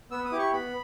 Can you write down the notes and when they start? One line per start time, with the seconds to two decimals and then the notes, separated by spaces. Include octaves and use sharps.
0.11 B3 E6
0.25 D#6
0.32 E4 G4 D6
0.39 C#6
0.52 B3 B5